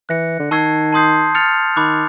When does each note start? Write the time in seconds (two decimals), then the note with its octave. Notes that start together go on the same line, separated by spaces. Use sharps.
0.09 E3 F#6 A#6 C#7
0.40 D3
0.51 D#3 A5 C#6 E6 G#6 C7
0.93 A5 C6 D#6 G6 C7
1.35 F6 A6 C#7 F7
1.76 D#3 B5 D6 F#6